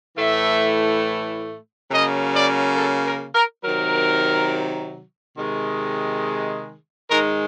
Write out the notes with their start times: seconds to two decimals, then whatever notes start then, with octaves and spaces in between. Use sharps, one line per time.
0.17 A2 E3 A3 E5
1.90 C#3 F#3 A#3 D#5
2.34 D5
2.77 A4
3.06 A#4
3.35 A#4
3.64 C3 D#3 F#3 A#4
5.37 C3 D#3 G#3
7.10 G#2 D#3 G#3 A#4